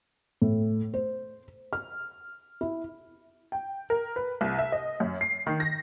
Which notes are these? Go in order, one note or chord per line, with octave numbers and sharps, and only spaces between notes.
A2
C5
F6
E4
G5
A#4
B4
C2
E5
D#5
F#2
C7
D#3
A#6